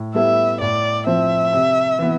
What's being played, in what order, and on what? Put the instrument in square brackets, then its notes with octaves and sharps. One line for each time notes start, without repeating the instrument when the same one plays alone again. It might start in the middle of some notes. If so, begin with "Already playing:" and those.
Already playing: [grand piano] A2
[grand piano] G3 B3 E4 A4 [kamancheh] E5
[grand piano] A2 [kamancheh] D5
[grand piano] F3 C4 [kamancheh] E5
[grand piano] C3
E3 B3